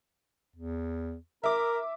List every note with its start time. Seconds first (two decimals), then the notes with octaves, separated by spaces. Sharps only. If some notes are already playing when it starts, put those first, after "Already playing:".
0.56 E2
1.44 A#4 E5 D6